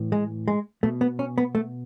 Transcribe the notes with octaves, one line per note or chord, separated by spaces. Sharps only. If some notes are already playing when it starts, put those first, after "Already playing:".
Already playing: A2 E3
G#3
G#3
B2 A3
B3
C#4
B3
A3